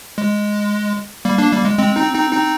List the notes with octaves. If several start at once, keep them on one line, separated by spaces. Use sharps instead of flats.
G#3
G3 A#3
A#3 D4
G3 A#3
G#3
G#3 C4
C4 D#4
C4 D#4
C4 D#4